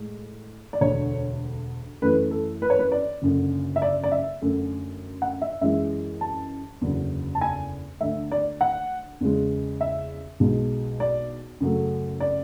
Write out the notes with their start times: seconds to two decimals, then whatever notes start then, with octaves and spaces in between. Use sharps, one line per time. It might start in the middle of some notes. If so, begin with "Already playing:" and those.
Already playing: A2 G#3
0.73 D5
0.81 E1 D2 D3 C#5
2.02 F#2 E3 A3 B4
2.31 A4
2.62 B4
2.70 C#5
2.79 B4
2.92 D5
3.22 F#1 F#2 D3
3.76 E5
3.82 D5
4.04 D5
4.12 E5
4.41 F#2 D3 A3
5.22 F#5
5.42 E5
5.61 F#2 E3 G#3 E5
6.21 A5
6.81 F#1 E2 D3 F#3
7.35 A5
7.41 G#5
8.00 D2 D3 A3 E5
8.32 D5
8.61 F#5
9.21 E2 C#3 G#3
9.81 E5
10.40 B1 B2 G#3
11.00 D5
11.60 F#2 C#3 F#3 A3
12.20 D5